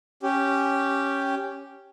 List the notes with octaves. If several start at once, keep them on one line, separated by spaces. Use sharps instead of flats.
C#4 G4